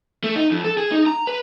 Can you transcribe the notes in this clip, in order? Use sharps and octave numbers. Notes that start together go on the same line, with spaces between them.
A3
D#4
F2
A4
G#4
D#4
A#5
B4